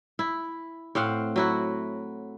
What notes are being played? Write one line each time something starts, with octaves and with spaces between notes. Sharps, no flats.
E4
A2 C4 F5 F#5
F#3 E4 F#4